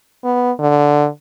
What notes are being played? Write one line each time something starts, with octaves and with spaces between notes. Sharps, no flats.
B3
D3